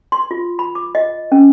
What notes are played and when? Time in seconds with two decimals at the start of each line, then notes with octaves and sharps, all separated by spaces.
0.12 C6
0.31 F4
0.59 B5
0.75 D6
0.95 D#5
1.32 C#4